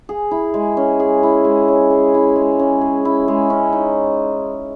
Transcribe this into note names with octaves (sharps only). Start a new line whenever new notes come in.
G#4
E4
G#3
C#4
G#4
E4
G#3
C#4
G#4
E4
G#3
C#4
G#4
E4
G#3
C#4
D#4